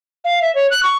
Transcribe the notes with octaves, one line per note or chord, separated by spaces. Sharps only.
F5
E5
C#5
F#6
C#6